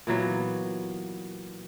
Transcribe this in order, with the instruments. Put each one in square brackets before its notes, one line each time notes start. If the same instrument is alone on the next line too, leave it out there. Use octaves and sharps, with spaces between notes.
[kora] A#2 E3 F#3 B3